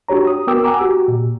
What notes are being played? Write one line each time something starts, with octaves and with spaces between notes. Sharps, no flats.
D4 F#4 G4 C#5 A#5
D#6
B3 F#4 A#4 G5 D6 E6
F#5 G#5 A#5 D6 E6
F#4 G4
A#2